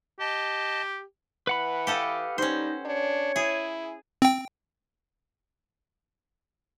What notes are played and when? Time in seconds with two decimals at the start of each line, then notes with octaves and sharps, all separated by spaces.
0.20 G4 D#5 A5
1.47 E3 B4 F#5 B5
1.87 G4 A4 D#5 F5
2.38 G3 C#4 D#4 C5
2.85 D4 C#5
3.36 E4 G#4
4.22 C4 G5